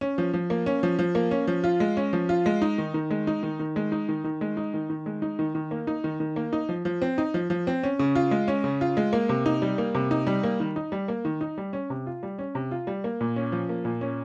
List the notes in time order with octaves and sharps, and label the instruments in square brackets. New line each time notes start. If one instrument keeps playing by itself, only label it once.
[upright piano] C#4
F3
F3
A#3
C#4
F3
F3
A#3
C#4
F3
F4
G#3
C#4
F3
F4
G#3
D#4
D#3
D#3
G#3
D#4
D#3
D#3
G#3
D#4
D#3
D#3
G#3
D#4
D#3
D#3
G#3
D#4
D#3
D#3
A#3
D#4
D#3
D#3
A#3
D#4
F3
F3
C4
D#4
F3
F3
C4
C#4
C#3
F4
G#3
C#4
C#3
F4
G#3
A#3
C3
D#4
G3
A#3
C3
D#4
G3
A#3
D#3
D#4
G3
A#3
D#3
D#4
G3
C#4
C3
F4
G3
C#4
C3
F4
G3
A#3
A#2
C#4
F3
A#3
A#2
C#4